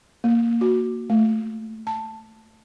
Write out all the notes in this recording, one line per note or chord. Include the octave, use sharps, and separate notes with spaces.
A#3
F#4
A3
A5